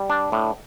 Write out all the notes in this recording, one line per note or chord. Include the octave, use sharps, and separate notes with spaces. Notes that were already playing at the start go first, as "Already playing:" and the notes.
Already playing: G3
D4
A2